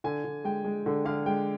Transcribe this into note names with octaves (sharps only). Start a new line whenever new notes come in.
D3 G#5
D3
G#3 G5
G#3
D3
D3 F5
G#3 G5